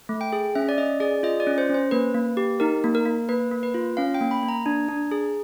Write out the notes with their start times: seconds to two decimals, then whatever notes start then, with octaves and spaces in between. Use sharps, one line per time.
0.09 A3
0.21 G5
0.33 G#4
0.55 C#4 E5
0.69 D5
0.78 C#4 D#5
1.00 G#4 D5
1.23 F4 D#5
1.40 D5
1.47 C#4
1.58 C5
1.70 C#4 C5
1.91 A#3 B4
2.15 A#3
2.37 G4
2.60 D#4 A#4
2.84 A#3
2.95 A#4
3.06 A#3
3.29 A#3 B4
3.51 A#3
3.63 B4
3.74 F4
3.97 C#4 F5
4.14 G5
4.21 A#3
4.31 B5
4.43 A#3
4.49 A#5
4.66 D4
4.88 D4
5.11 G#4